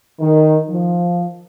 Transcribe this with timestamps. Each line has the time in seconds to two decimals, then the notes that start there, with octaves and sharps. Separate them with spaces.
0.20 D#3
0.69 F3